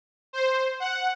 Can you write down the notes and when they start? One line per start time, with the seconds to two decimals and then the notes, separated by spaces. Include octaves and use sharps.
0.33 C5
0.80 F#5